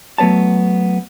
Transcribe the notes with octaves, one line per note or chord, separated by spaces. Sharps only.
F#3 A3 B3 C#5 A5